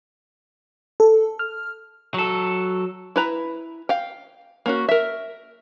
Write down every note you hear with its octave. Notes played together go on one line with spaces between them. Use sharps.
A4
F6
F#3 A4
E4 B4 A#5
F5 G5
A#3 C#4 F#4
A#4 E5